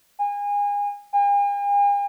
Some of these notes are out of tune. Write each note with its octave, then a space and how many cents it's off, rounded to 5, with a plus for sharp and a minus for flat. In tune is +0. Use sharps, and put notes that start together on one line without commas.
G#5 -30
G#5 -45